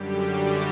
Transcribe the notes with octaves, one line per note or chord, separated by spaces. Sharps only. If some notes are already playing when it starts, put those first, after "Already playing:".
Already playing: F#2 D3 G3 G4
F#4